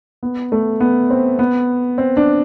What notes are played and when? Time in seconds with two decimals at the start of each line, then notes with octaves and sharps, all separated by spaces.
0.23 B3
0.52 A3
0.80 B3
1.10 C4
1.39 B3
1.98 C4
2.17 D4